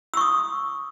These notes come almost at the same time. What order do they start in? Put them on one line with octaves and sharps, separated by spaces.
E6 C#6 D#6